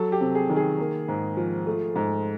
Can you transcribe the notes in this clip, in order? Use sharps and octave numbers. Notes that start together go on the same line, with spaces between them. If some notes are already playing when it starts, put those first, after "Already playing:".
Already playing: F#3 A4
G4
C3
G#4
D#3
G#4
A#3
G#2
F3
A3
G#2